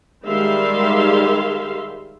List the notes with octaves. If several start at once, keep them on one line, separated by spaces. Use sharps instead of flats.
D#3 G3 G#3 E5 F5 C6